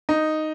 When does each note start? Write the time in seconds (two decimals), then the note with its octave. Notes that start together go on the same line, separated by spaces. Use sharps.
0.09 D#4